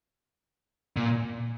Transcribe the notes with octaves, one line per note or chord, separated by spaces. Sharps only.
A#2